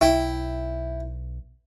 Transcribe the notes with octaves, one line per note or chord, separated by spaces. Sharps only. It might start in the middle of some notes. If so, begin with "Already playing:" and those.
B1 E4 G5